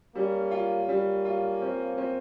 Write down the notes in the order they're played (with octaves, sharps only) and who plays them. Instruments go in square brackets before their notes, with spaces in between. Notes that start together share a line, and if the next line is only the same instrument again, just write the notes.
[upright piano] G3 [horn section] A#3 C#4
[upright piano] F4
[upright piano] G3 [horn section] A#3 C#4
[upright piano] F4
C4
C4